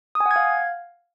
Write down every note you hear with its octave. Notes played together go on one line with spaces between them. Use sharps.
D#6
G#5
F#5
G#6
F5